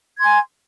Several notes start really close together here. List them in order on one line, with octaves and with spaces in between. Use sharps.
G#6 C6 G#5